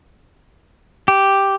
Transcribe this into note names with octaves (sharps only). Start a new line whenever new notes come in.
G4